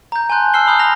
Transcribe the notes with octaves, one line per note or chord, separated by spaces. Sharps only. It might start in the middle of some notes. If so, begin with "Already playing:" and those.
A#5 G6
G#5 A5 C6 F#6 G6
A5 E6 F6 C7 G7
A#5 B5 D#6 F6 G6
F6 A#6 F7